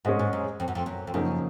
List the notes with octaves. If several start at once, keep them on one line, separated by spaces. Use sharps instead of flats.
G#2 G#3 C#4 G#4 C5 D#5
G#2
F#2
F2
F#2
F2
F#2
F2
F#2 C#3 F3 A#3 D#4 G#4